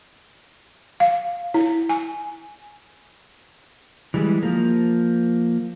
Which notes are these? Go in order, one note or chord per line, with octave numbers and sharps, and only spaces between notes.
F5
E4
G#5
E3 G3 G#3
F3 A#3